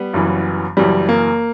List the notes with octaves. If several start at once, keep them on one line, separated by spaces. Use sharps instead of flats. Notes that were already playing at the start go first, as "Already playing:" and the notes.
Already playing: G3 B3
F#1 F#2 E3
F#1 F#2 E3 G3
A#3